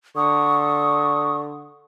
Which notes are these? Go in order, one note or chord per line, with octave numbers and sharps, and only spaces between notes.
D3 C#6 D#6